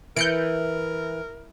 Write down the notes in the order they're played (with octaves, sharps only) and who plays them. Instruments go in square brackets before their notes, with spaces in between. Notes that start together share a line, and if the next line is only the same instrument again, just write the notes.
[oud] E3 [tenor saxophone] A#4 [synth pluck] G6 C#7 D7